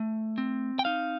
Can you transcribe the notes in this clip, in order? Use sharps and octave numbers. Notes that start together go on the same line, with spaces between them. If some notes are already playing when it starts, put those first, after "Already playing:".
Already playing: A3
C4
G5
D#4 F5